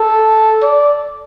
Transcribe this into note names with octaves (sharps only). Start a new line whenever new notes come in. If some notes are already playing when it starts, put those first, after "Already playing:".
Already playing: A4
D5